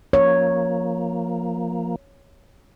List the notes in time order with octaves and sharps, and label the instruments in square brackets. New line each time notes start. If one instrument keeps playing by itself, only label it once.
[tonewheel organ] F3 A#3 [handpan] C#5